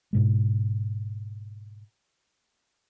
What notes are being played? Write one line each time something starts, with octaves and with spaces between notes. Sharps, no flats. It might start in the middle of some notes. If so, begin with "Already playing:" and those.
G#2 B2 G#3